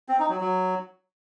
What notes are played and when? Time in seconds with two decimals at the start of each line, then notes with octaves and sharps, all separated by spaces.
0.09 C4
0.19 D#4
0.30 F#3
0.40 F#3